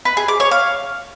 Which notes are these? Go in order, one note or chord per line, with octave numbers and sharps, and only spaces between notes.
B4
G#4
D6
C#5
F5